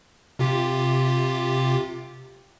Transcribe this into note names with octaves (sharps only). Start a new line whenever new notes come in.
C3 F4 G4